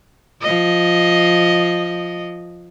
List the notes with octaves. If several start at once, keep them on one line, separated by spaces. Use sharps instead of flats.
F3 D#5